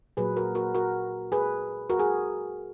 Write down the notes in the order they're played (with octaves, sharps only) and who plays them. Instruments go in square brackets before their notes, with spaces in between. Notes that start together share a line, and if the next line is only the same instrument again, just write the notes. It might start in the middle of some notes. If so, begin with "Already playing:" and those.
[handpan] A#2 F#3 A#3 G#4 B4
F#4 A#4
F#4 A#4
F#4 A#4
G#4 B4
F#4 A#4
G#4